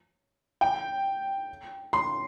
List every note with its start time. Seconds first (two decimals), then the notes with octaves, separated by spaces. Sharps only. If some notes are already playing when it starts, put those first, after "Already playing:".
0.61 G5
1.93 C6